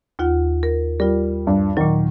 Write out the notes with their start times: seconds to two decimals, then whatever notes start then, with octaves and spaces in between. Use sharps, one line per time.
0.19 D#2 F4 F#5
0.63 A#4
1.00 G3 F4 A#4
1.47 G2
1.77 A#2 D#3 F#3